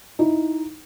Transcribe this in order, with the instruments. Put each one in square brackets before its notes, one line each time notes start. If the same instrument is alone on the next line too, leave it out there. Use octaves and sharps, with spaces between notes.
[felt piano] D#4 E4